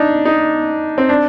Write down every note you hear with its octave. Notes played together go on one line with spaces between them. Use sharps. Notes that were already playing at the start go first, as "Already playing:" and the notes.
Already playing: D4 D#4
D#4
C4
D4